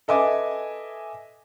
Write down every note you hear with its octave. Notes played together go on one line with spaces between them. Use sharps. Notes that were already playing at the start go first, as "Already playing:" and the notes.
A4 B4 D#5 E5 G#5 D6